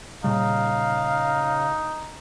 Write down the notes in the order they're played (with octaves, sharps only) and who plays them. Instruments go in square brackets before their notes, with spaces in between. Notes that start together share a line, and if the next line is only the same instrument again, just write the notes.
[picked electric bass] A#2 G3 [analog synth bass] C#3 [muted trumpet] D#4 [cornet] F5